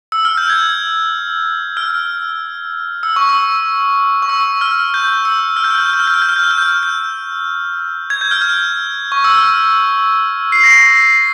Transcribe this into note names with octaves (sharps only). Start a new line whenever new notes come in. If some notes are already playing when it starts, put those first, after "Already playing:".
E6
F6
G6
G#6
F6
E6
C#6
E6
C#6
E6
F6
G6
E6
F6
G6
F6
G6
F6
G6
F6
G6
F6
G6
F6
G6
F6
G6
F6
G6
G#6
G6
F6
G6
C#6
E6
F6
C7
A#6
C7